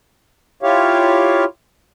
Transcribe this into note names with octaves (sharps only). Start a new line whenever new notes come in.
E4 F4 G4 C#5 F5